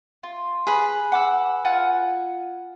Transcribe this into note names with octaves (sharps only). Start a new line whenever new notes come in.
F4
G#4 B4 B5
F#5 D6 E6
F4 F#5 G#5